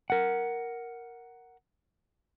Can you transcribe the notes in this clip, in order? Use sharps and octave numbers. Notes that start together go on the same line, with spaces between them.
A#4 F#5